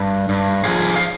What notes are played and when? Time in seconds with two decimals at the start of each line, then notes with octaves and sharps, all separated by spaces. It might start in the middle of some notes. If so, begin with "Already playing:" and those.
Already playing: G2
0.29 G2
0.65 F3 F4 G#4
0.96 F5